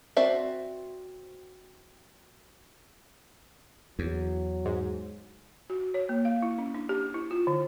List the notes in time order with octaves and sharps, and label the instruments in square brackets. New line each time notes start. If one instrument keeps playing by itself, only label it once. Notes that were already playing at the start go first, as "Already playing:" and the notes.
[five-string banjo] C4 F#4 C5 D5 E5
[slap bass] E2 [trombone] F#3
[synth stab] G#2
[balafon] F#4
C#5
A#3
F5
E4
C#4
D4
G4
E4
F4
D3